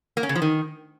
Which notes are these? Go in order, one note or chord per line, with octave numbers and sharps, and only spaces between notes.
A#3
C#4
C#3
F3
D#3